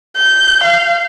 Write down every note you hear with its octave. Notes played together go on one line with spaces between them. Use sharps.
G6
F5